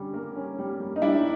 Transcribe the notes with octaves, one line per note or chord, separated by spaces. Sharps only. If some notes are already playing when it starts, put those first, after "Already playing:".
Already playing: D3 G3 C#4
A#3
C#4
G3
G3
D#4
G3 D4 E4